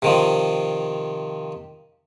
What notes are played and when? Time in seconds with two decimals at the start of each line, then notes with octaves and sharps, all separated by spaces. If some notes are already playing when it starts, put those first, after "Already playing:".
0.02 C3 D#3 F3